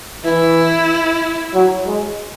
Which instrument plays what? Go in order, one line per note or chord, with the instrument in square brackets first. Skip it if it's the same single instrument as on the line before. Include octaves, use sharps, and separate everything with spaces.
[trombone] E3 [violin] E4
[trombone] F#3
G#3